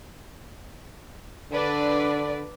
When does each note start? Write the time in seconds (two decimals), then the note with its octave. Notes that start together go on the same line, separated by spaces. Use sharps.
1.52 D3 D4 B4 D5